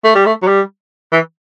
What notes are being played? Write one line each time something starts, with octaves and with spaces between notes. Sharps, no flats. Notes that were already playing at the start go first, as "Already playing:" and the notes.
A3
G3
A3
F#3
G3
E3